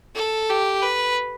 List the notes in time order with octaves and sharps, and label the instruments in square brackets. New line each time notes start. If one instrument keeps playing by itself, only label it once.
[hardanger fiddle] A4
G4
B4